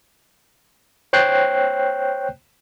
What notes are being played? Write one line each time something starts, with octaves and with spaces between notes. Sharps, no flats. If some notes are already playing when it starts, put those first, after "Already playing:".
C5 C#5 G5 F#6 G6 C7